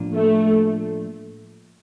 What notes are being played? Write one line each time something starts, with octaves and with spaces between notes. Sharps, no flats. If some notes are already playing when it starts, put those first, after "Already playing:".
Already playing: A2 F3 A#3 D4 F4
A3